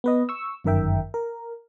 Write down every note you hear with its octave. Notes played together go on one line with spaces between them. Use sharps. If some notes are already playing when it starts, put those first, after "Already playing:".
B3 B4 D#5
C#6 E6
G1 F#2 D#3 A#4 E5 G5
A#4